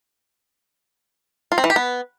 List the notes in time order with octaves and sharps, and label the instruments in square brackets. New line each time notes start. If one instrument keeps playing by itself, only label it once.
[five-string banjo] F4
C4
E3
G4
B3